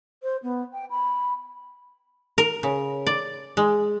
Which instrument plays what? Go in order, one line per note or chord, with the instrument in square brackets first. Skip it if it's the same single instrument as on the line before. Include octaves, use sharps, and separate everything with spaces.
[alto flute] C5
B3
G5
B5
[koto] A#4
C#3
D5
G#3